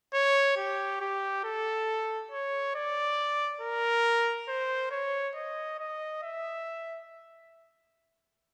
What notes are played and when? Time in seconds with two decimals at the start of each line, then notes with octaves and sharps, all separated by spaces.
0.14 C#5
0.57 G4
1.01 G4
1.44 A4
2.31 C#5
2.75 D5
3.61 A#4
4.48 C5
4.91 C#5
5.36 D#5
5.79 D#5
6.23 E5